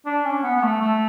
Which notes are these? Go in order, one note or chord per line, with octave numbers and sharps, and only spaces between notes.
D4
C#4
B3
B3
A3
A3